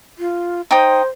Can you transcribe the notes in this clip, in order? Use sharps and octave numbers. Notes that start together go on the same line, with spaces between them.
F4
D#4 C5 G5 D#6